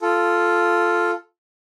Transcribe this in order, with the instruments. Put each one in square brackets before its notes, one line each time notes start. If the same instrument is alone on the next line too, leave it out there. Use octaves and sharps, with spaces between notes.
[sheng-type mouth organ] F4 A4